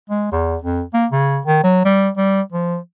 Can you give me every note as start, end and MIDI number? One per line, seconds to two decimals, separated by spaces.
0.10 0.28 56
0.32 0.56 40
0.62 0.82 41
0.94 1.07 58
1.12 1.39 49
1.46 1.62 51
1.64 1.82 54
1.85 2.09 55
2.17 2.41 55
2.52 2.78 53